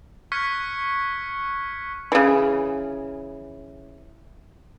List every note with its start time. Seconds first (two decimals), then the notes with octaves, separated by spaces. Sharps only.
0.32 C#6 F6 F#6 G#6 B6 C#7
2.12 C#3 E3